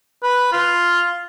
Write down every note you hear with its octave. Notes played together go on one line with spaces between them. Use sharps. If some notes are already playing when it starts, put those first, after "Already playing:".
B4
F4